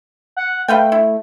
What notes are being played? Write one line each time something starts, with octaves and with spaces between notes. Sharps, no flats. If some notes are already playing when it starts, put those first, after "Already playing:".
F#5
A3 B4 F5 G5
E4